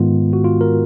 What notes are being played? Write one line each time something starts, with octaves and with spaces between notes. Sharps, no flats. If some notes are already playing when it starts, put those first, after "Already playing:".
Already playing: G#2 D#3 G#3 B3 F4
F#4
F4
A#4